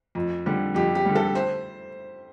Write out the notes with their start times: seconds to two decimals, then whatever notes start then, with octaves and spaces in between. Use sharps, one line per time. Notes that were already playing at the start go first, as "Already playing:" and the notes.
0.15 F2
0.46 D3 G3
0.75 F2 G4
0.95 G4
1.06 D3 G3
1.15 A4
1.35 C5